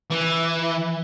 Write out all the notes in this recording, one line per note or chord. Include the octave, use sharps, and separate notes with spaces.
E3